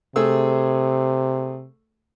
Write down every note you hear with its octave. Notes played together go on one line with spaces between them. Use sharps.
C3 A3 G#4 E6